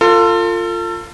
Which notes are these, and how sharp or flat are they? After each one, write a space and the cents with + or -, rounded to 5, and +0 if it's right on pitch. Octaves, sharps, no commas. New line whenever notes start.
F4 +0 A4 +35